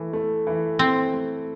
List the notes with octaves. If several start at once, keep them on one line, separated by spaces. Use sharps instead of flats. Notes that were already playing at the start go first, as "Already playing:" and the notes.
Already playing: E3 A3
A3
E3
A3 C4
A3